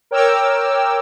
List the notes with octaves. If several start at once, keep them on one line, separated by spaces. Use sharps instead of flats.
A#4 C#5 G5 D6 E6 F6